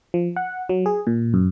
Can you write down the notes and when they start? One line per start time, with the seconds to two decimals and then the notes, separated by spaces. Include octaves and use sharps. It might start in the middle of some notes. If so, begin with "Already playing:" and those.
0.14 F3
0.36 F#5
0.69 F#3
0.86 G#4
1.07 A#2
1.34 F#2